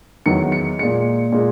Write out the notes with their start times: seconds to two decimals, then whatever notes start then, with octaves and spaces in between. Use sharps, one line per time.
0.26 E2 D#3 F#3 C#7
0.52 C#7
0.79 A#2 G#3 C#7
1.32 A#2 G#3